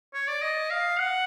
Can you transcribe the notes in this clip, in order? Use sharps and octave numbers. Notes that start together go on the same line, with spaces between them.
C#5
D5
D#5
F5
F#5